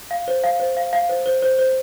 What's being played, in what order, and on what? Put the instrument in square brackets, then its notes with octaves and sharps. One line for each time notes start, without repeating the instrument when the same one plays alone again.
[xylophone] F5
C5
F5
C5
F5
F5
C5
C5
C5
C5